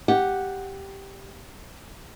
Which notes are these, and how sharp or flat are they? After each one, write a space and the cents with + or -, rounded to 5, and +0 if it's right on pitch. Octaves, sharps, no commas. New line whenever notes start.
G4 +0 F#5 +0